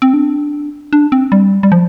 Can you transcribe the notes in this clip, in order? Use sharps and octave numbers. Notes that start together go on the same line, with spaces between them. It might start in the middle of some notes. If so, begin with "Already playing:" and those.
C4
D4
D4
C4
G3
G3
F3